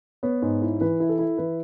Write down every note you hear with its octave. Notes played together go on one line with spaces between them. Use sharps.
B3 C#5
G#2
E4
E3 B4
E4
A4
E4
E3 B4